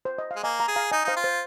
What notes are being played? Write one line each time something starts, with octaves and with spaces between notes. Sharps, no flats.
C5
D#5
F5
G#3
A#3 D#5 G#5
F5 A#5
G#4
F5 A#5
D#4 D#5 G#5
D#4 C5 F5
F4
C5